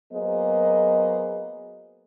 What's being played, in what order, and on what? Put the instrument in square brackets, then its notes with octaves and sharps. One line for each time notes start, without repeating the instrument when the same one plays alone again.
[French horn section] F#3 A#3 B3 G#4 C5 D#5